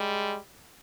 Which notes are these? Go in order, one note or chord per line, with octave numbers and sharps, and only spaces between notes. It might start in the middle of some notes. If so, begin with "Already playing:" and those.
Already playing: G3 G#3